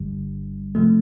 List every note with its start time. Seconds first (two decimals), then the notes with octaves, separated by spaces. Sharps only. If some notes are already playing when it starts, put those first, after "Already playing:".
Already playing: G1 G2 D3 G3
0.75 C3 F3 A3